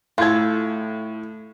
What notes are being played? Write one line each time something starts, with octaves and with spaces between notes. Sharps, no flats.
A2 F4 A4 G#6